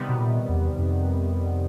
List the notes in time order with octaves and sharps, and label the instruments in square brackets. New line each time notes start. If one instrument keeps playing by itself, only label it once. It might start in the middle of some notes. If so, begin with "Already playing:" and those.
Already playing: [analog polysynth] C3 D#3 G3 B3
[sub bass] B2
A#2
E2
F2